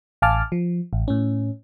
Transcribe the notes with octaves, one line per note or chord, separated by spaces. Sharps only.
A1 F5 G#5 A5 D6 F6
F3
A1
A2 C#4